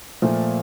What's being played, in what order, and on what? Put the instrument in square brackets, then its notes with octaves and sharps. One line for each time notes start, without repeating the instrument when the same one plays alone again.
[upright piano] A#2 F3 A3